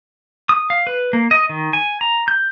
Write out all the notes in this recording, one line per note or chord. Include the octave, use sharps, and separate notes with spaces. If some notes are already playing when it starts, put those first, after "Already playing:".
D#6
F5
B4
A#3
D#5
D#3
G#5
A#5
G6